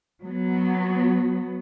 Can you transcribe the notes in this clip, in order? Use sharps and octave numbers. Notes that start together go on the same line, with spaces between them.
F#3 B3